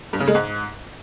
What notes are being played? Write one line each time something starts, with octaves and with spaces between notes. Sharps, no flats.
G2
C#3
G#3
G#2